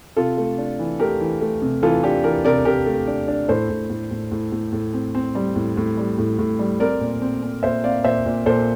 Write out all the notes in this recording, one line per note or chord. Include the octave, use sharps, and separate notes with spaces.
C3 F4 A4
A3
D4
E3
A3 G4 A#4
E3
A3
C3
E3 F4 A4
D4 G4
E3 G4 A#4
C3 A#4 D5
C3 G4 A#4
A3
D4
D4
A2 A4 C5
A2
A2
A2
A2
A2
A2
C4
C4
G3
A2
A2
G3
A2
A2
G3
C4 A#4 D5
A#2
C4
C4
A#2 C5 E5
C4 D5 F5
A#2 C5 E5
A#2
A#2 A4 C5